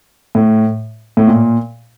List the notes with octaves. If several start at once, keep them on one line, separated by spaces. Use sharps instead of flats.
A2
A2
A#2